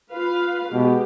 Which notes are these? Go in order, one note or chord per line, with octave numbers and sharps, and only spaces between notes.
F4 B4 F5
B2 G#3 G4